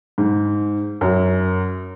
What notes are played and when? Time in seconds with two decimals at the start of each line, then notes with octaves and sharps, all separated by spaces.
0.18 G#2
1.01 F#2